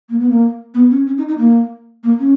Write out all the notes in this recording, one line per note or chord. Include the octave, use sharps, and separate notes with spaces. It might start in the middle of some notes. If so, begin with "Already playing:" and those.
A#3
B3
A#3
B3
C#4
C#4
D#4
D#4
A#3
A#3
C#4